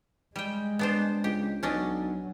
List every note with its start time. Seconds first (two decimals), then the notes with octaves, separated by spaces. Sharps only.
0.36 G3 G#3 G5
0.79 B3 D4 C5
1.24 C#2 G4
1.63 B1 F#3 C#4 D4 D#5